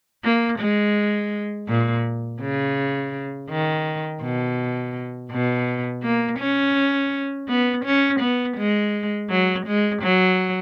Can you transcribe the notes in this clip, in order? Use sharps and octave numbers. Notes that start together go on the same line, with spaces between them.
A#3
G#3
A#2
C#3
D#3
B2
B2
A#3
C#4
B3
C#4
B3
G#3
F#3
G#3
F#3